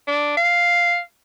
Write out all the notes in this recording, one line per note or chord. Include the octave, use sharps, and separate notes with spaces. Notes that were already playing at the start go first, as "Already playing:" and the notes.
D4
F5